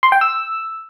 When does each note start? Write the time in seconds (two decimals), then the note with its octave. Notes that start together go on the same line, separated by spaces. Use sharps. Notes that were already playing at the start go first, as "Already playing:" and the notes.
0.03 C6
0.12 G5
0.21 E6